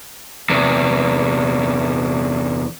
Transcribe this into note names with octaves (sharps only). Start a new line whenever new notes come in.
E2 C3